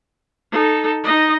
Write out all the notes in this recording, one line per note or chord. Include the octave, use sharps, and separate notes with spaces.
D#4 A4
D#4 D#5